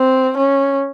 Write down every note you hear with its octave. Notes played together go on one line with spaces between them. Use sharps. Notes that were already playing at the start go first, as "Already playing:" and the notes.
Already playing: C4
C#4